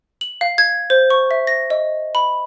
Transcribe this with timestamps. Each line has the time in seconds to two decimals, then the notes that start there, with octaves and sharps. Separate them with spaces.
0.21 F#7
0.41 F5
0.58 G#6
0.90 C5
1.10 C#6
1.31 E5
1.47 A#6
1.70 D#5
2.15 B5